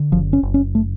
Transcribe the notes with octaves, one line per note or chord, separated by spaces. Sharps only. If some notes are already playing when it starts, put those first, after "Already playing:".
Already playing: D3
F#1 F3
C#4
F#1
C#4
A3